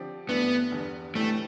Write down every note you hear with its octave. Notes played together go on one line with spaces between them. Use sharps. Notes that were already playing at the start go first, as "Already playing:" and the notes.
Already playing: D3 F3 C4 G4 D5
G2 E3 A3 B3 D4
E2 D3 G3
A2 E3 G3 A3 C4